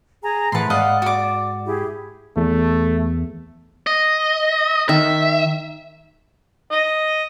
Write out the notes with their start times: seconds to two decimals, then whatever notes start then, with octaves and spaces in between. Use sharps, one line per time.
0.23 G#4 G#5 A#5
0.52 A2 E3 B4 F#5 A5 B5 C6
0.70 G#2 D5 D#5 F5 F#5
1.02 F#4 D6
1.66 E4 G4 G#4
2.37 E2 A3
3.87 D#5
4.89 D#3 E5
6.71 D#5